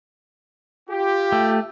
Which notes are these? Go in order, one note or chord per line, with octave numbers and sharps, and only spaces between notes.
F4 G4
A3